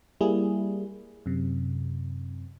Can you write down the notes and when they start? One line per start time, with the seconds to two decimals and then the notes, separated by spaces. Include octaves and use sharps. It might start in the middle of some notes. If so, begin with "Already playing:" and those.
0.21 G3 A#3 E4 G#4
1.26 F#2 C3